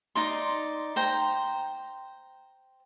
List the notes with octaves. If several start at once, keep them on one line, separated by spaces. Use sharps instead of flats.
D#4 D5 C6
C5 G5 A#5